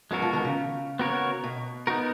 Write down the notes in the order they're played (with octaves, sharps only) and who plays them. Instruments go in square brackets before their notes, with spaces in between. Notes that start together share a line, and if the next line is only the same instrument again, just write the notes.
[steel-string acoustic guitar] F#2 F#3 [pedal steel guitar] G#3 B3 F#4 A#4
[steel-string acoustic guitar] F2 F3
D#2 D#3
C#3
[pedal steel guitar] B3 F#4 A#4 C#5
[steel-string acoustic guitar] B2
[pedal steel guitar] B3 D#4 F#4 A#4